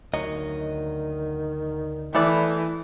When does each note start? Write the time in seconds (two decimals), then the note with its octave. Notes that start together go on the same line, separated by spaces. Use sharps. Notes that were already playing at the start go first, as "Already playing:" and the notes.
0.13 D2 D#3 F#3 D#5
2.15 E3 A3 B3 E4 A4 D5